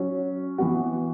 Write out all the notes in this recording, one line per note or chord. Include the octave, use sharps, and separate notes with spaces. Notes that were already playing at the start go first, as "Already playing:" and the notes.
Already playing: F#3 C#4 F#4
E3 B3 F#4